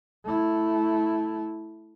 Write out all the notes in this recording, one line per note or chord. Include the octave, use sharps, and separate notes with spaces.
A3 E4